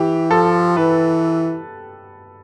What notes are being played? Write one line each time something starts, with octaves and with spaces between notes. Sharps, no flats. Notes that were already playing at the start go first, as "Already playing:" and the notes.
Already playing: E3 G4
F3 A4
E3 B4